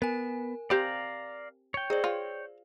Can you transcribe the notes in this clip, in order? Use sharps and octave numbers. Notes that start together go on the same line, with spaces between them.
B3 A#4 G#5
C4 G4 C5 D5 F5 A#5
C#5 G5
D#4 G#4 C5 D5
F4